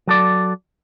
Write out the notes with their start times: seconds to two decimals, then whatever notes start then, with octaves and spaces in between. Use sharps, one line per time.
0.07 F#3 A4 D5